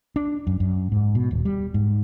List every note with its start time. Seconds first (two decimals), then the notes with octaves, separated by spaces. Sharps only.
0.16 D4
0.47 F#2
0.60 F#2
0.92 G#2
1.15 B2
1.31 D#1
1.45 G3
1.74 G#2